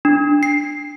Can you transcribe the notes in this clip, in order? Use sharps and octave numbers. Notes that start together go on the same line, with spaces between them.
D4
C7